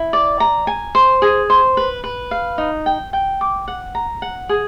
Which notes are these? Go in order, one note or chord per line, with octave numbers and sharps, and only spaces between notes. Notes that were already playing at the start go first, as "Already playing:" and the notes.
Already playing: E4
D5
A#5
G#5
C5
G#4
C5
B4
B4
F5
D#4
G5
G5
D6
F#5
A#5
F#5
G#4